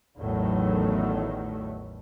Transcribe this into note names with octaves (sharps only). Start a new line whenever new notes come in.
A1 E2 A2 D#3 F#3 A3